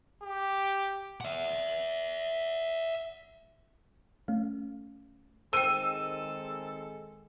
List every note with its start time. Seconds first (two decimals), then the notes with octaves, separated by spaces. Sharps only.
0.23 G4
1.21 E5 F#5
4.28 A3 C#4 F5
5.53 D#3 G#3 C4 A4 C5 G5 E6 D#7